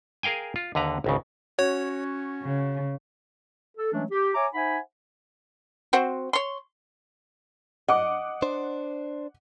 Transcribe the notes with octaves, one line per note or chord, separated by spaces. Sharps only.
G#4 A#4 F5 G5 G#5
F4
D#2 D3 B4 A#5
G#1 C#2 C#3
C#4 F#4 C#5
C#3
A4
E3 F#3 G#3 A3 C#4 D4
G4
C#5 E5 G#5 A#5 D6
D#4 C5 E5 F#5 G#5 B5
C4 F#4 C5
C#5 C6
D#5 F#5 D6
D4 C5